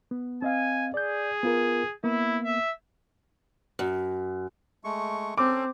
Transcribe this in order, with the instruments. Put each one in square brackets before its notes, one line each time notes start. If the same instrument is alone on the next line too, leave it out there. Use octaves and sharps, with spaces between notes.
[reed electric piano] B3
[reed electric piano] C4 D#5 F5 [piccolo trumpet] G#5
[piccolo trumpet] G#4 [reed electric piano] D5 G6
[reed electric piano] B3 F4 A#4
[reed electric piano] A#3 B3 [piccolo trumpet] E4
[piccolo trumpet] E5
[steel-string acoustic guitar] F#2
[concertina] G#3 A3 C#6
[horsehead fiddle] C4 [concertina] C#4 A4 [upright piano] D6